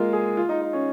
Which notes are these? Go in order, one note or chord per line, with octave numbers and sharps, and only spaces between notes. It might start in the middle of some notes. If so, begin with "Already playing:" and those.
Already playing: G#3 A#3 F4
G#4
F4
D#4
D#4
C#4